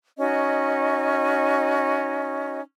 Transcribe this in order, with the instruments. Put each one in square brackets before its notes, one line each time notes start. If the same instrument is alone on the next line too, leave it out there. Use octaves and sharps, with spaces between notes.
[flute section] C#4 D#4 F#4 D#5